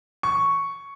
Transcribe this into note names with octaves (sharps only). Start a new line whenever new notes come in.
C#6